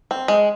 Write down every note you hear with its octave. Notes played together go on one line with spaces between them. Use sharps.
C4
G#3